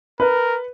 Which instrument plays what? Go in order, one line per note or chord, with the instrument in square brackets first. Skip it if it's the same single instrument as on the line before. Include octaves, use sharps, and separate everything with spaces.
[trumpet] A#4 [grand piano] B4